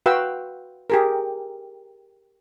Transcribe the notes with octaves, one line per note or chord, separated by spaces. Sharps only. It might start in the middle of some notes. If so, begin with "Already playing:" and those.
F#4 B4 F5 G5 E6
G4 G#4 A#4